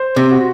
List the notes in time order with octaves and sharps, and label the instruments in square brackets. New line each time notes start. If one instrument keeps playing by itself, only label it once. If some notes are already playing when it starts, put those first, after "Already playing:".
Already playing: [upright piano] C5
[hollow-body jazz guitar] C3
[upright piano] F#4